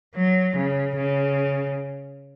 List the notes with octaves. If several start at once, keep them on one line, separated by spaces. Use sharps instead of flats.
F#3
C#3
C#3